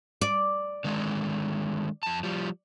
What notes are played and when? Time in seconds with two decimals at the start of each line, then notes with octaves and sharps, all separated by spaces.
0.21 D5
0.84 D3 D#3 G#3
2.03 F2 A5
2.23 F3 G3